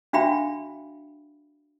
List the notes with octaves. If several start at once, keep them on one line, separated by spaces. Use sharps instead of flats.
D4 F#4 E5 F5 G5 B5